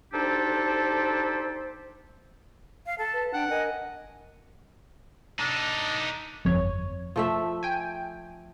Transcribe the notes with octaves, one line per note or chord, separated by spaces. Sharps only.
D2 D4 D#4 G4 A4 C5
F5
A4 A5
B4
D4 F#5 G5
A#4 D#5 G#5
D4 D#4 A4
G1 F2 C#5
F3 A3 E5
G5 G#5